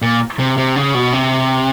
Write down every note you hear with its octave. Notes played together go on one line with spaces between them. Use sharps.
A#2
C3
C3
C#3
B2
C3